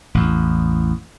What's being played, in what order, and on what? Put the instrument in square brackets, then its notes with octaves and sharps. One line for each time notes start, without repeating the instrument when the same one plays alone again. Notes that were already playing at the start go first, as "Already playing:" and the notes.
[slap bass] A1 E2